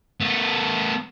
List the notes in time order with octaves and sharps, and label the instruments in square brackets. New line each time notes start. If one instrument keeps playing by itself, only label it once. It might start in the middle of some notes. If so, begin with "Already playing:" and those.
[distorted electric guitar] A3 B3